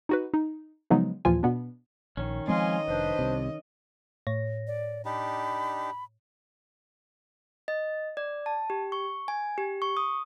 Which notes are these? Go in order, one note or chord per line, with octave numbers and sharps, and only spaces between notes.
D#4 F#4 B4
D#4
C#3 F3 F#3 G#3 B3 D#4
D#2 A#2 E3 F3 F4 G#5
B2 B3 D4
A#1 D#3 C#4
F3 G#3 C4 D#5 F5 G#5 C6
F1 D4 B4 C5
C2 C3
A2 C#5 A#6
D5
D4 D#4 G4 B5
D#5
D5
A5
G4
C#6
G#5
G4
C#6
D#6